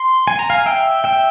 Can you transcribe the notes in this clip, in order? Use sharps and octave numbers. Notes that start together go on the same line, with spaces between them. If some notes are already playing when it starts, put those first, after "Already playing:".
Already playing: C6
G#5
A#5
F5 G#5
E5 G5
E5 G5